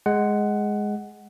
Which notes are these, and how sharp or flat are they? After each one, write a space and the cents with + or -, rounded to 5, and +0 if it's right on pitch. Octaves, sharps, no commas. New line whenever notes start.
G#3 +0 F#5 +10